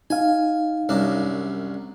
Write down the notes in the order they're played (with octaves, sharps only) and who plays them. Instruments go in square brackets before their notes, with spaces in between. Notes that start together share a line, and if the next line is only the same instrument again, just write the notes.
[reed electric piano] D#4 F5 [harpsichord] G#5
[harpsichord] C2 F#2 D4